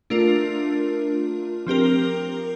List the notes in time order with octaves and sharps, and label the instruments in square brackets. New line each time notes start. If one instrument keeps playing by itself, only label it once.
[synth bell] A3 D4 F4 A#4
F3 C4 G4 A#4